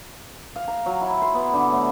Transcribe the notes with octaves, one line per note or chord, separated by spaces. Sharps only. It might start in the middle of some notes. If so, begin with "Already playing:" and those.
F5
A#5
F#3
E4
C6
B3
D3
A2